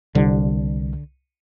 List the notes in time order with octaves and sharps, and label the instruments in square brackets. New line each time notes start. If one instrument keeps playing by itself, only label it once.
[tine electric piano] C2 [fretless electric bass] D3